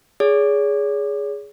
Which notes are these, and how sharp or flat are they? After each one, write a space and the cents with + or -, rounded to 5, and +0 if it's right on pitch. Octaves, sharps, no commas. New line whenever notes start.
G#4 +0 C#5 +40